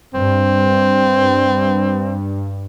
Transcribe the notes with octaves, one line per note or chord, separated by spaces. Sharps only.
G2 C4